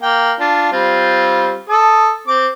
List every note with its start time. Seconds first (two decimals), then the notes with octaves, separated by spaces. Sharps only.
0.02 A#3 G5
0.40 D4 F4
0.72 G3 C4 F4
1.69 A4 A5 D#6
2.27 C4 D6